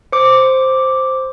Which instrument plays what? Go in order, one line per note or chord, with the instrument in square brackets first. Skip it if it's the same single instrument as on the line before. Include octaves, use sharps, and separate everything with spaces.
[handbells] C5 D6